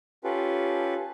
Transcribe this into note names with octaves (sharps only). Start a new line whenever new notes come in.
C#4 F4 G4 A4 B4